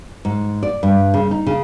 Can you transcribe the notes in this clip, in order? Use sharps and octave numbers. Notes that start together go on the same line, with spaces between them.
G#2
D5
G2
C#3
D#4
C#3